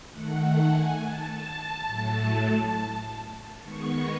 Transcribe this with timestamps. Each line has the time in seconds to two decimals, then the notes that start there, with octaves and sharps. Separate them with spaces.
0.12 D#3 A3 F#5
0.41 F#5
0.70 G#5
0.99 A5
1.86 A2 F#3 A3
3.61 D#3 G#3 B3 C#6